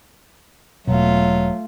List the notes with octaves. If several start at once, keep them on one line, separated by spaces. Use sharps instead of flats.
E1 B2 F#3 A3 F4